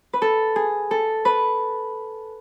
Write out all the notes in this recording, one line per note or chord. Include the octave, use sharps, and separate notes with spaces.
B4
A4
G#4
A4
B4